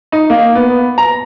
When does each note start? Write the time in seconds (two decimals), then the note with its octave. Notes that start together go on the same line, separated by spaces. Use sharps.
0.12 D#4
0.30 A#3
0.55 B3
0.98 A#5